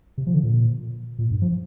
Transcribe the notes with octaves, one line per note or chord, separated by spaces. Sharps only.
C3
F3
D3
A#2
A#2
G2
F3